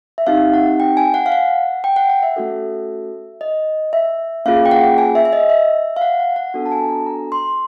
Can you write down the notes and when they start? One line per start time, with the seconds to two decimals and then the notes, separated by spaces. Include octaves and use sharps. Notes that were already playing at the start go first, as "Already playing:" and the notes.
0.18 E5
0.27 C4 D#4 G4 F5
0.53 F#5
0.80 G5
0.97 G#5
1.14 F#5
1.26 F5
1.32 F#5
1.84 G5
1.96 F#5
2.10 F#5
2.22 E5
2.36 A3 C#4 F#4 A4
3.41 D#5
3.93 E5
4.46 A#3 C#4 F4 G#4 F5
4.66 G5
4.71 F#5
4.98 G#5
5.15 E5
5.25 E5
5.33 D#5
5.49 E5
5.96 F5
6.01 F#5
6.20 F#5
6.36 F#5
6.54 B3 D4 F#4 A4
6.66 A5
6.72 G#5
6.88 A#5
7.06 A#5
7.32 C6